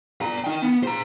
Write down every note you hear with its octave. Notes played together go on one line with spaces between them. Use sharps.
D5 A#5
D#4 G5
B3
C5 A#5